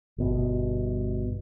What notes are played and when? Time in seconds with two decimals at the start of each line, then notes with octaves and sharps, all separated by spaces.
0.18 G1 B2